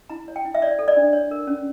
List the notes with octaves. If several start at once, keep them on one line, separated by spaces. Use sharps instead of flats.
E4 A#5
C#5
G5
E4
E5
C#5 D5
A4
D5
D4
C#5
A#4
C#4